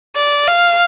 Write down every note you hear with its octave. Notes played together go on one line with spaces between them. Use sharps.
D5
F5